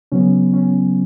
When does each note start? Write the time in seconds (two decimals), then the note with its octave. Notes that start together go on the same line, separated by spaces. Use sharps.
0.12 C#3 F#3 B3 C#4
0.53 C#4